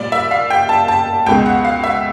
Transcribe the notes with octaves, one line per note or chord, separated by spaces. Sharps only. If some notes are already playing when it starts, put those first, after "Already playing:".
Already playing: A#2 G3 D5
E5
F5
G5
A5
A5
C#2 B2 G#3 G5
F#5
F5
E5